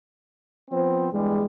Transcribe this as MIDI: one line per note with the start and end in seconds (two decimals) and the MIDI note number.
0.71 1.08 53
0.71 1.08 59
0.71 1.08 60
0.71 1.08 72
1.12 1.44 40
1.12 1.44 43
1.12 1.44 55
1.12 1.44 56